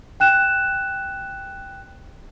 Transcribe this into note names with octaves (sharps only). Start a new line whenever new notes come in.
G5 F#6 E7